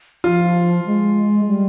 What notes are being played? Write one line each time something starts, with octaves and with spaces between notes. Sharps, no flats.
F3 F4
G#3
G3